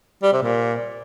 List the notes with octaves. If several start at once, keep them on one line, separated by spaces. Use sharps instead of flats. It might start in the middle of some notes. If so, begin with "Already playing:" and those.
G3
C3
A#2